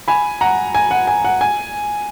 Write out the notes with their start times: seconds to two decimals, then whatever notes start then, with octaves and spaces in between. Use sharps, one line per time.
0.08 G#5 B5
0.41 F#5 A#5
0.75 G#5
0.91 F#5
1.07 G#5
1.25 F#5
1.41 G#5